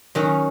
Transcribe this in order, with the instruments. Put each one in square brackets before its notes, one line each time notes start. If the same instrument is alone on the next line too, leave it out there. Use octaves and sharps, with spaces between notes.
[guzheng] D#3 F#3 C#4